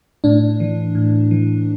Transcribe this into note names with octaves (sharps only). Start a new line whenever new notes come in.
A2 D4
E3
A2
E3